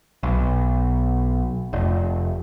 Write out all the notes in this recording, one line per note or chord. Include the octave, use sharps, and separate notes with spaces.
B1
F1